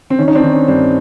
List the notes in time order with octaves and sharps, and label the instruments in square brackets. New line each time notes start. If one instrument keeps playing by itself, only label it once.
[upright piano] C4
D#3 C#4
D#4
C4 D4
D#3
C#4
G2 C4 D4